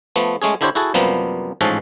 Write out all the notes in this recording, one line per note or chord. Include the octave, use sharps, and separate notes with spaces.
F3 A3 B3
G#3 A3 C#4 G#4
D3 D4 E4 G4 C5 C#5
E4 F#4 G#4 A4
F#2 C3 F3 G3 A#3 B3
A1 G#2 F3 C#4 A4